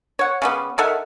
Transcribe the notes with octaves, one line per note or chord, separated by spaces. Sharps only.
C#5 F#5
C#3 G3 B3
D#3 A4 E5 F#5